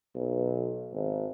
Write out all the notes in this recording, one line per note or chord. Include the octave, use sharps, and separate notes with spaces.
B1
G#1